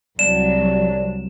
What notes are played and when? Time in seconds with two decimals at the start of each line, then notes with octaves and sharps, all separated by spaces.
0.19 C2 F#3 D4 E7